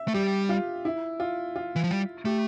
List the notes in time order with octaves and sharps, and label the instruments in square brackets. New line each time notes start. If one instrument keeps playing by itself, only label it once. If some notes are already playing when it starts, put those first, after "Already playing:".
Already playing: [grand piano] E5
[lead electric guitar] A3
[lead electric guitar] G3 [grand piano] G4
[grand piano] F4
E4
F4
F4
[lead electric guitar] E3
F3
G3
[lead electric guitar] A3 [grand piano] G4